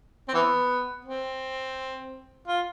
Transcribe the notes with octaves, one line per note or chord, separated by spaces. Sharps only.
C4
E3 B3
C4
F4